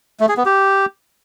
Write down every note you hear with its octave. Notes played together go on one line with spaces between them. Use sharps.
A3
G#4
B3
G4